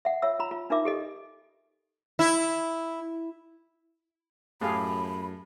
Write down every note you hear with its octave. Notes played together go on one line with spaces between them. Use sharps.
E5 F#5
F4 C#5 E5 E6
F4 A#5 B5
F4
D4 D#4 F4 A#4 E5 D6
G4 A4 D#5
E4
F#2 A2 G4 G#4 F5 B5